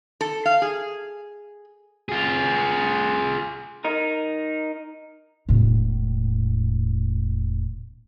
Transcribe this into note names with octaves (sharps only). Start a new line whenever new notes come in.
A4
F5
G#4
F4 G#4
D#4 A#4
E1 A2